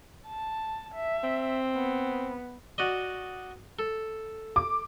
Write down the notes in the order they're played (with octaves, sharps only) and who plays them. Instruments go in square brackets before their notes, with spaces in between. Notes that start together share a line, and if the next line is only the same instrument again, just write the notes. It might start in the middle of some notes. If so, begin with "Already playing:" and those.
[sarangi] A5
E5
[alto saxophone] C4
[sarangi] B3
[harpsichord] F#4 D5 D#5
A4
[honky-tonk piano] D6